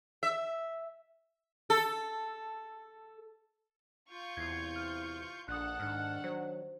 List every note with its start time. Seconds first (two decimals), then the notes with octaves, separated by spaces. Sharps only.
0.23 E5
1.70 A4
4.08 F4 C#6 G6
4.37 E2 C3 C4 E4 G#6 C7
4.76 F6
5.48 A#1 D4 A4 F#5 D#6 F#6
5.80 G#2 D#3 D4 F6 F#6
6.24 F#3 C5